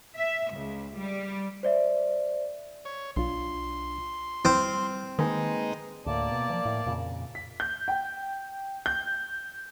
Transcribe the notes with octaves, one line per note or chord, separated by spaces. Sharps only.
E5
C#2
G3
C5 D5 E5
C#5
B1 D4 F4 C6
G3 C4 E4 F6
D#3 G#3 A#3 D#4 B4 G#5
D2 A2 A#3 D5 A5
B2
E3 F3
A2
F2 A#2 C#3
B6
G6
G5
G6